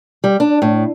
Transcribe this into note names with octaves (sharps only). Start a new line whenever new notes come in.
G3
D4
A2